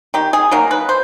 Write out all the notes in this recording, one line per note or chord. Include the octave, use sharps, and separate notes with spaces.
D#3 G4
G#4
F#3 A#3 D#4 A#4
B4
C5